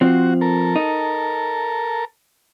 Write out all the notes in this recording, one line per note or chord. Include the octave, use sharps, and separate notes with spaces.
F3 C4 F#4
A4 A#4
D#4